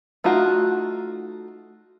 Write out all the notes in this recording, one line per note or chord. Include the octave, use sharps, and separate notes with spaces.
A3 D#4 F4 F#4